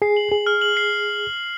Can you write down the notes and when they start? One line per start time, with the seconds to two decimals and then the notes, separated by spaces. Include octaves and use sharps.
0.02 G#4 C7
0.17 F#7
0.31 G#4 F#7
0.47 F6
0.61 F#7
0.77 C7